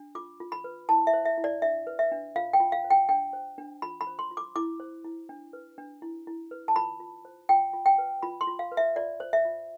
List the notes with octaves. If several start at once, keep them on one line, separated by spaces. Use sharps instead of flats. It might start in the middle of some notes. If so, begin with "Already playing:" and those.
Already playing: D4
F4 D6
F4
B5
B4
E4 A5
E5
C5
E5
E4
D5
D4 E5
B4
E5
D4
F4 F5
G5
F4
F5
C5
G5
D4 G5
C5
D4
F4 B5
B5
C5
C6
F4
D6
E4 D6
C5
E4
D4
B4
D4
E4
E4
B4
A5
F4 B5
F4
C5
F4 G5
F4
G5
B4
F4 B5
C6
F4
F5
B4
E5
F4 D5
C5
E5
F4